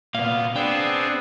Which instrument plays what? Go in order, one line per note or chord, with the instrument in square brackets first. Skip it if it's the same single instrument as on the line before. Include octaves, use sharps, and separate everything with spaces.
[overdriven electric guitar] A#2 B3 [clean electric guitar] F5
[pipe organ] B3 C4 G#4 [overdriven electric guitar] D4 [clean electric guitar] G5